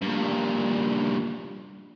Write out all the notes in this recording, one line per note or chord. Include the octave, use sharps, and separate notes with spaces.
G2 A#2